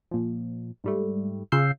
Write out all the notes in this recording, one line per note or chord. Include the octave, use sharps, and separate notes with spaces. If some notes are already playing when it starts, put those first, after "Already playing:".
A#2 F3
G#2 G3 A3
C#3 F4 F5 E6 G6 C7